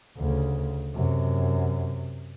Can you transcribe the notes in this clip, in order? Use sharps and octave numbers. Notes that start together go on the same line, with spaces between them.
D2 C#3
F#2 C3